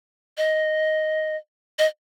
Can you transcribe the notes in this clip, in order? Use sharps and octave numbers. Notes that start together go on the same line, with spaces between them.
D#5
D#5